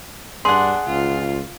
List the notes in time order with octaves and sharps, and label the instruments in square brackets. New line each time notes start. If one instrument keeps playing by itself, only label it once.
[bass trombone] G2 [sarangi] D4 [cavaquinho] G#4 F#5 [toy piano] C6
[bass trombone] C#2 [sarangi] F4